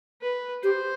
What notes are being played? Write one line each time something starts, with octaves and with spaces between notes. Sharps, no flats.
B4
G4 C5